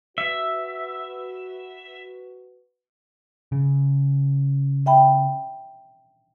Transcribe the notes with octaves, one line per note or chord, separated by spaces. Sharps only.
F#4 B4 E5
C#3
E5 G5 B5